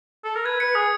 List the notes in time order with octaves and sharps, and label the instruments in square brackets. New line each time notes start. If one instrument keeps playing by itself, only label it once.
[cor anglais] A4
A#4
[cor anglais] B4 [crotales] G#6
[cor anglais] B4 [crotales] C#7
[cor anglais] G#4 [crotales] D#6